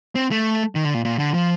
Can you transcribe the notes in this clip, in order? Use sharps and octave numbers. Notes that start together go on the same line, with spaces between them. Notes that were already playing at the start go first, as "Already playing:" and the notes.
C4
A3
D#3
D3
A#2
A#2
D3
F3